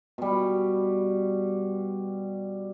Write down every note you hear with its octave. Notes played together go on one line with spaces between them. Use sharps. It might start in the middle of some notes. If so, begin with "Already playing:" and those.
B2 G3